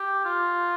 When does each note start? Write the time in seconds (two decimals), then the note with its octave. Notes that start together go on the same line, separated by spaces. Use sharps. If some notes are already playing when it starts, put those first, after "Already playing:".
Already playing: G4
0.25 F4